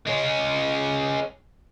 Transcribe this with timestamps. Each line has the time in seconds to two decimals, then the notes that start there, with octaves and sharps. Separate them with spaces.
0.07 G#3 C#4